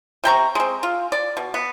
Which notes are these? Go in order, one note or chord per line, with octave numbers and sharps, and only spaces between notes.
C3 G5 A#5 C#6
G#3 C4
F4
D5
B2
B3